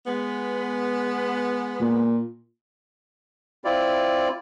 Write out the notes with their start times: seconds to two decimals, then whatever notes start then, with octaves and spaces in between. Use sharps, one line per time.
0.07 G#3 B3
1.81 A#2
3.65 C4 E4 F4 D5